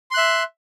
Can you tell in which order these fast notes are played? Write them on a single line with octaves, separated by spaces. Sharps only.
C6 F#6 E5